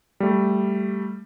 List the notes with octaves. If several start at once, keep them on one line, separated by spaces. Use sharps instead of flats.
G3 A3